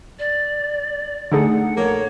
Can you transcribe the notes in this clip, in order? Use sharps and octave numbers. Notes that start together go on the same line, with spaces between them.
D5
D3 A3 D#4 G#4 F#5
A#1 A#3 A4 C#5